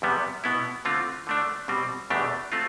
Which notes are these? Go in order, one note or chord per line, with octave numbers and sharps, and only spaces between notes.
E2 C3 G3 B3
B2 B3 E4
D3 A3 C4 F4
D3 A3 D4
B2 G3 C4
E2 B2 A3 D4 G4
A3 C4 F4